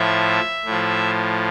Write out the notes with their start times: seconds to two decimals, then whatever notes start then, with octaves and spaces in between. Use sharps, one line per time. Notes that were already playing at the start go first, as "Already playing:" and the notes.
Already playing: A2 F3 E5
0.65 A2 F3